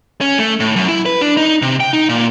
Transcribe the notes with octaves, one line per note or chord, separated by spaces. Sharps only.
C#4
A3
A2
F#2
E4
B4
D4
D#4
C3
G5
D#4
A#2